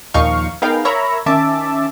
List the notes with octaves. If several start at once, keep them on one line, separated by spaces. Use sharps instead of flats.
D#2 A#2 F3 D#4 F5 C#6
B3 D#4 G#4 A#4 F5 G5
A#4 C#5 E5 A#5 B5
D#3 C#4 E5 A5 D6